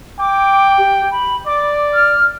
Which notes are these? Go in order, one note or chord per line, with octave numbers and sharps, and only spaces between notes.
G5 D6
G4
B5
D5 D6
F6